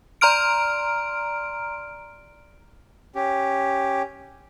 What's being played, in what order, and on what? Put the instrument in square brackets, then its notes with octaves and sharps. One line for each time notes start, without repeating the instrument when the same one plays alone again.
[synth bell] D5 A#5 C6 F6 D7
[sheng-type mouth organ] C#4 G4